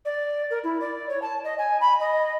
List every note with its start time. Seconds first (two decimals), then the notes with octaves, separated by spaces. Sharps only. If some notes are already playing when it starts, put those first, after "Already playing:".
0.05 D5
0.50 A#4
0.64 E4
0.80 D5
1.09 C#5
1.22 A5
1.44 D#5
1.58 G#5
1.81 B5
2.00 D#5